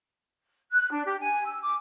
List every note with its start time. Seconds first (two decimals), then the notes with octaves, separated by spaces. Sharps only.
0.71 F#6
0.92 D4
1.05 G4
1.22 G#5
1.46 E6
1.63 D6